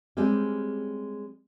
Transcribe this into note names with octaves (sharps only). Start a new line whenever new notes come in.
G3 G#3 C4 C#4 G4